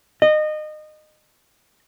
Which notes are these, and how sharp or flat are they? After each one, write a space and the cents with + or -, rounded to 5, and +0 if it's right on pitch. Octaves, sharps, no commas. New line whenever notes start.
D#5 -25